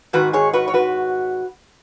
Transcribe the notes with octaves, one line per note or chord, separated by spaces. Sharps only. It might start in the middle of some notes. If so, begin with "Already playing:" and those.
G#2 D#3 F#4 B4
G#4 C#5
F#4 B4
C#5
F#4 B4